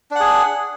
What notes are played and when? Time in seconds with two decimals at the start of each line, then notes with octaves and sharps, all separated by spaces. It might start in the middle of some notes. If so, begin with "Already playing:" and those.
0.11 D4
0.16 F#5
0.20 G#4